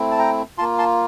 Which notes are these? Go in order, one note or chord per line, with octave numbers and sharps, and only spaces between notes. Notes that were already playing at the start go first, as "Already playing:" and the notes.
Already playing: A3 C4 E4
A5
G5 A#5
A#3 F4 A5 C6
A5 C6